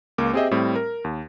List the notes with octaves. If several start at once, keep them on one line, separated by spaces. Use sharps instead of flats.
C#2 A#3 D6
C4 G4 G#4 C5 D#5 E5
A2 G3 C4
A#4
D#2